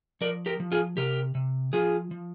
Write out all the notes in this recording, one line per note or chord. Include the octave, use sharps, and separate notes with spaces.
F3 A#4 D5
G4 A#4
F3
F4 G#4
C3 G4 A#4
C3
F3 F4 G#4
F3